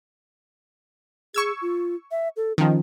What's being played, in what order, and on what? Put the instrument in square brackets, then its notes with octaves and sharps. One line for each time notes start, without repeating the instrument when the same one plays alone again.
[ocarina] G#4 [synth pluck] C#6 E6 G#6
[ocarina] F4
E5
A4
[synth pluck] D#3 F3 [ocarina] C#4